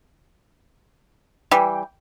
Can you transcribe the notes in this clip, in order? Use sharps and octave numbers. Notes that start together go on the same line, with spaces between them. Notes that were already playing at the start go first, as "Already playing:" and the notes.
E3 G3 G5